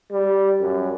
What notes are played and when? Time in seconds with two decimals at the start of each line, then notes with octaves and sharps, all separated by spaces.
0.12 G3
0.61 F#2